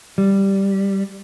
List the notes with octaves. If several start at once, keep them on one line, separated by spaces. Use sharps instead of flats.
G3